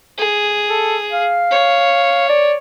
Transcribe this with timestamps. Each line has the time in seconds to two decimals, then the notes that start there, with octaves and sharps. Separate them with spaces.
0.18 G#4
0.70 A4
1.12 F5
1.51 C#5
2.29 D5